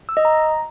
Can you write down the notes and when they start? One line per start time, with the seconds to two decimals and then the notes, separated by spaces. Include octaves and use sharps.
0.09 E6
0.17 D#5
0.25 A#5